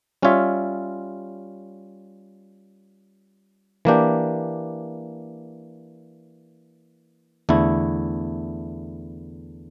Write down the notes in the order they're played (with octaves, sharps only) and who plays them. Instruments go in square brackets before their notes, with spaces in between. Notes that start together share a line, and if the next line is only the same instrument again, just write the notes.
[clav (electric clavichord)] G3 C#4 F4 C#5 E5
E3 A#3 D4 G4
E2 D3 A3 E4